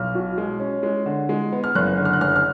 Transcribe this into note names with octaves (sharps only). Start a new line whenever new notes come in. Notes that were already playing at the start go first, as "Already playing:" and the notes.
Already playing: B1 F6
B2
G#3
C#4
G#3
D3
G#3
B3
F6
F#1 F#6
D3
F6
F#6
F#1 F6
F6